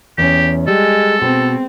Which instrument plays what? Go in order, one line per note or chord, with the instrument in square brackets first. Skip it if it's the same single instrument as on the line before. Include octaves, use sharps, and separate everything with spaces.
[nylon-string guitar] E2 C#4 [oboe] G4
[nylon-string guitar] G3 [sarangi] G#3 [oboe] A4
[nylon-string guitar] B2 [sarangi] C4